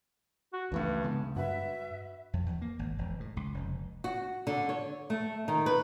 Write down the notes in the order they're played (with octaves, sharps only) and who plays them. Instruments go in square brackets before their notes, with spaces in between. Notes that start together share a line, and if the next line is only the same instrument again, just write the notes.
[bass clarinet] F#4
[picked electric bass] C#2 E3 A3 [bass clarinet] G2
[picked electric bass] C#3 G#3 B3
[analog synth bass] G2 [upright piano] F#4 B4 [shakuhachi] E5
[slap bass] F2
E2
A#3
G#1
E1
A2
C#2
F1
[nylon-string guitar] F#4
D3
C#5
A3
D#3
B4